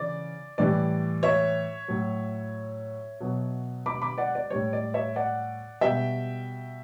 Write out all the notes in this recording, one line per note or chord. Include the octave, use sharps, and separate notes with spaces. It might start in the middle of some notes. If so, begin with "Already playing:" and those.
Already playing: C#3 E3 D5
A2 E3 G3 D5
C#5 E5
A2 F#3
B2 F#3
B5 D6
B5 D6
D5 F#5
D5
A2 G3 C#5
D5
C#5 E5
D5 F#5
B2 G3 E5 G5